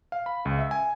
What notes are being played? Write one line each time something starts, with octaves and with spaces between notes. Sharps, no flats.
F5
B5
C#2
E5
G#5